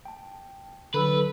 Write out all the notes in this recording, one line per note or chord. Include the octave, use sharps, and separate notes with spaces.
G5 A5
D3 F#3 A4 B4